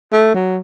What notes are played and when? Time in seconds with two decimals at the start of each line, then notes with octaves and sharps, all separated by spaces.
0.13 A3
0.34 F#3